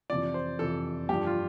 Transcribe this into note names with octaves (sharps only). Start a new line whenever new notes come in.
F2 C3 E3 D5
C5
F2 C3 E3 A4
G2 F3 G4
F4